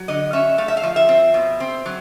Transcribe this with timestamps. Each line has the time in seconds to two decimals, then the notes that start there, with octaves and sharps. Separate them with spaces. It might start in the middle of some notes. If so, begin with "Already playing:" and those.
Already playing: F#3
0.08 D3 D#5
0.33 C#4 E5
0.58 A3 F5
0.68 E5
0.77 F5
0.83 F3
0.96 E5
1.09 C4
1.34 B2
1.60 C4
1.86 F#3